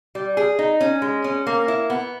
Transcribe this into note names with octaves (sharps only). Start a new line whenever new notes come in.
G3
G#4
D#4
C#4
G#3
C#4
A#3
E4
B3